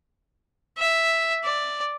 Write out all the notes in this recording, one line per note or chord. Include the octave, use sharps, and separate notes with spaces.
E5
D5